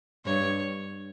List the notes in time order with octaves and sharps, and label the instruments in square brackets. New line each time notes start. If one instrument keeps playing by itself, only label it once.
[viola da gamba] G2 [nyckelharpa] C#5